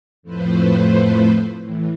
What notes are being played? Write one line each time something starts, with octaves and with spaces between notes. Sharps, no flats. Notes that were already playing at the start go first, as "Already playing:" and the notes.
F2 A2 F3 A3 B4 C5
A2 E3